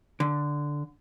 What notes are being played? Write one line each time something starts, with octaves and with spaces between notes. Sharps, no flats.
D3